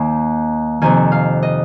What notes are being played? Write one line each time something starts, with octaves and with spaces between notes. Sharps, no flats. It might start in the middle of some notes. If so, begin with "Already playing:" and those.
Already playing: D#2 D#3 G#5
F2 C3 D#3 G#5
F5
D#5